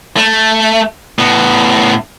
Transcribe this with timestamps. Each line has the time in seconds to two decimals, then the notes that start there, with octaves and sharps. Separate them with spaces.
0.17 A3
1.19 A2 B3